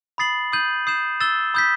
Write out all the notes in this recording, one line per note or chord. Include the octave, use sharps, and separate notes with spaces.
B5 D#6 A6 C7 F#7
D#6 G6 D#7 F#7
D#6 G6 C7 E7
E6 A6 E7 G7
B5 D#6 G6 B6